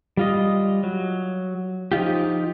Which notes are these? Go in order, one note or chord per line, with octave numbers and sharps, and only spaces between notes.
G3 F4 D#5
F#3
F3 D#4 F4 G4